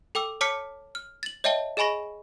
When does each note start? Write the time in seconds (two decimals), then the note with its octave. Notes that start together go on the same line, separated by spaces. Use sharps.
0.15 A4 G5 D6 E6
0.41 C#5 A5 D6 F6 B6 C#7
0.95 F6
1.23 A6 F#7
1.44 C#5 D#5 E5 G5 A5 G7
1.77 G#4 D#5 G#5 B5 C#6 A#6